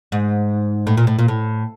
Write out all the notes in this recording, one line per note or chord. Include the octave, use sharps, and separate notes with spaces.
G#2
A2
A#2
A2
A#2
A2